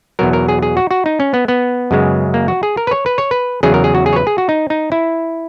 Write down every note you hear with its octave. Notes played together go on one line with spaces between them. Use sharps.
E2 B2 F#3 A#4
A#4
G#4
G#4
F#4
F#4
D#4
C#4
B3
B3
F#2 C#3 G#3
A#3
F#4
G#4
A#4
B4
C#5
B4
C#5
B4
E2 C#3 F#3 G#4
A#4
G#4
F#4
G#4
C#5
B4
G#4
F#4
D#4
D#4
E4